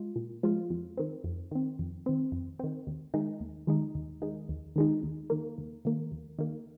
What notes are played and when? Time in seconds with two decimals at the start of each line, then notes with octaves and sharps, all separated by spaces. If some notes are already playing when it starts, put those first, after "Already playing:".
Already playing: G#3 F4
0.16 A#2
0.43 F3 G#3 F4
0.70 F2
0.97 D#3 C4
1.24 F2
1.51 D#3 C4
1.79 F2
2.06 D#3 C4
2.32 F2
2.59 D#3 C4
2.87 D#2
3.14 D#3 G#3 D#4
3.40 D#2
3.67 D#3 G#3 D#4
3.95 D#2
4.22 D#3 G#3 D#4
4.49 D#2
4.76 D#3 G#3 D#4
5.03 D#2
5.30 D#3 A#3
5.58 D#2
5.85 D#3 A#3
6.12 D#2
6.39 D#3 A#3